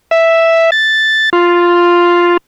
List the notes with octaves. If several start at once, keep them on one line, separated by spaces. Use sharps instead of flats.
E5
A6
F4